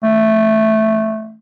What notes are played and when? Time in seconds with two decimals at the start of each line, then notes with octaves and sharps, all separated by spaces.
0.03 A3